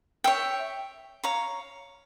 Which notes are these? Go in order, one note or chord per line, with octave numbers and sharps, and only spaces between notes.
C#5 E5 G5
C#5 F5 A#5